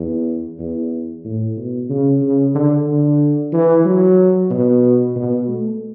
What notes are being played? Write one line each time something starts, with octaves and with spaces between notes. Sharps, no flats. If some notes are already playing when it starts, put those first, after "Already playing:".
Already playing: E2
E2
A2
B2
C#3
C#3
D3
D3
E3
F#3
B2
B2
A3